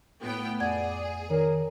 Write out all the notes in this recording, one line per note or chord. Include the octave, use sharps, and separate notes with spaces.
A2 B3 G5
F2 G#4 D5 F#5 G#6
D#3 A#4 C#5